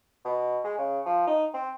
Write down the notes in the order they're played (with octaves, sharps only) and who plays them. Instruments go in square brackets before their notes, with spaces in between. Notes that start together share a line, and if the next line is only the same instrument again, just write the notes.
[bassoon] B2
G#3
C#3
F3
D#4
C4